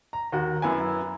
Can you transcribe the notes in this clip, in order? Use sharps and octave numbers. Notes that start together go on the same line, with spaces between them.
A#5
D#2 F#4
F#2 E4 B4 G#5